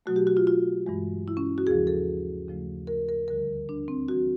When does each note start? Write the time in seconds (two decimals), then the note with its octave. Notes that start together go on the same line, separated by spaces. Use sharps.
0.06 B2 F#3 A3 F#4
0.16 G4
0.27 F#4
0.37 F4
0.47 F4
0.86 G2 E3 G#3
1.28 E4
1.37 C#4
1.58 F#4
1.67 D#2 C#3 F3 G#4
1.87 A4
2.47 D#2 C#3 F3 A3
2.87 A#4
3.09 A#4
3.28 D2 D3 G3 A#4
3.69 D4
3.88 C4
4.08 E3 G3 F#4